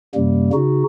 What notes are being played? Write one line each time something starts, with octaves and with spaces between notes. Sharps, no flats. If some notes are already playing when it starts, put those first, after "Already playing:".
F#2 C3 G3 A#3
C#3 D#4 F#4